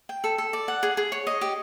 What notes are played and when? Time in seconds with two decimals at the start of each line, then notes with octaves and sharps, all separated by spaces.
0.09 G5
0.24 A4
0.38 A4
0.53 D5
0.68 F#5
0.83 G#4
0.97 G#4
1.12 C#5
1.27 D#5
1.41 G4